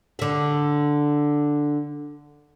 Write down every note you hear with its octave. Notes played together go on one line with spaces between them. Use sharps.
D3 E5